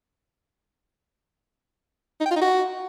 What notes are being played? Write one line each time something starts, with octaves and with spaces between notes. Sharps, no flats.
D#4
G5
F4
D#4
F#4